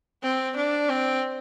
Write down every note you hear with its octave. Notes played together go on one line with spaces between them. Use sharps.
C4
D4
C4